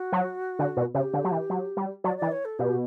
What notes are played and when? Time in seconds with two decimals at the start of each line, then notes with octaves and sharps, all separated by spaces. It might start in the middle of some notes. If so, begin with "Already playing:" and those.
Already playing: F#4
0.12 F#3
0.59 D3
0.77 B2
0.94 C#3 G4
1.14 D3
1.24 F#3
1.32 E3
1.50 F#3
1.77 G3
2.04 F#3 D5
2.17 E3 D5
2.32 C#5
2.45 A4
2.59 B2 G4